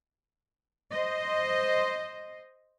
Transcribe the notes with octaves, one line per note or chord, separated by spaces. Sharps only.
C5 D#5